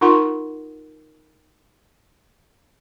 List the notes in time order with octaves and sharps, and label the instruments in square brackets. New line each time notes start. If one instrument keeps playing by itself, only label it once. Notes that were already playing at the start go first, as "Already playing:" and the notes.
[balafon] D#4 F4 A#4 F#5 C6